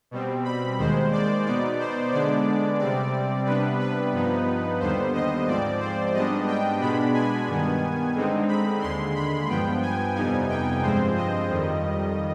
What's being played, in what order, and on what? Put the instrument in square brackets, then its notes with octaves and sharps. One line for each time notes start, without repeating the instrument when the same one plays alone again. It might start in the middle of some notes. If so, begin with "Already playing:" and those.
[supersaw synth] B2 G3 C4
B5
D#2 D#3 G#3 C5
D5
B2 B3 D#4 D5
C5
D3 G#3 B3 D4 D5
C3 G3 C4 D5
C3 G3 B3 D4 B4
B4
G2 F3 B3 D#4
D#2 D3 G3 B3 C5
D#5
G#2 F3 C4 D5
C5
G#2 G3 B3 D4 D#5
G5
B2 G#3 B3 D4 B5
G#5
G2 D#3 B3
D3 G#3 C4 D#4
B5
D#2 D3 G#3 C6
B5
G2 F3 B3 G5
G#5
F2 C3 G3 B3 D#4 G#5
G5
G2 F3 G#3 C4 C5
D#5
F2 D#3 G3